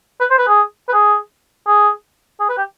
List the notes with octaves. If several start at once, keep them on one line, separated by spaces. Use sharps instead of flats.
B4
C5
B4
G#4
B4
G#4
G#4
G#4
B4
G4